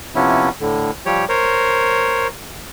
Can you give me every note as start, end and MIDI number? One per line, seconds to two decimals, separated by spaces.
0.15 0.49 48
0.15 0.49 53
0.15 0.49 59
0.15 0.49 61
0.15 0.49 64
0.60 0.91 45
0.60 0.91 50
1.06 1.25 53
1.06 1.25 55
1.06 1.25 67
1.06 1.25 73
1.29 2.27 70
1.29 2.27 72
1.29 2.27 73